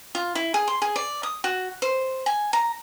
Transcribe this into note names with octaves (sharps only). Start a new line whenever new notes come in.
F4
E4
G#4
C6
G#4
D5
D#6
F#4
C5
G#5
A#5